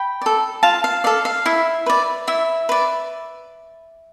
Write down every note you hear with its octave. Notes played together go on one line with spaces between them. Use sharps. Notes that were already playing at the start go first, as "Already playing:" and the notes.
Already playing: G5 B5
A4 D5
F4 F5 A5
F5
A4 D5 F5
F5
E4 E5
B4 D5
E4 E5
B4 D5